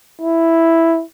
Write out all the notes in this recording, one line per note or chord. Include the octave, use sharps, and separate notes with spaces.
E4